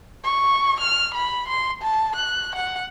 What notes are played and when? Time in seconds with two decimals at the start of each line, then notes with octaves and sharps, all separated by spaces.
0.24 C#6
0.80 F6
1.14 B5
1.48 C6
1.82 A5
2.16 F#6
2.56 F#5